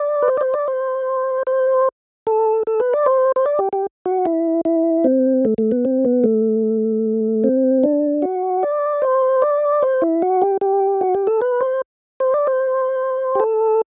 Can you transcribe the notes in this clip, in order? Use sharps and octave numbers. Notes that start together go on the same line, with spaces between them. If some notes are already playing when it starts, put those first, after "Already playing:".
Already playing: D5
B4
C5
D5
C5
D5
C5
C5
A4
A4
B4
D5
C5
C5
D5
G4
G4
F#4
E4
E4
C4
A3
A3
B3
C4
B3
A3
C4
D4
F#4
D5
C5
D5
C5
E4
F#4
G4
G4
F#4
G4
A4
B4
C5
C5
D5
C5
G4
A4